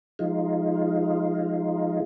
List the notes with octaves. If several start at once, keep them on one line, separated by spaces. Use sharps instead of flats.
F3 G#3 D#4 F4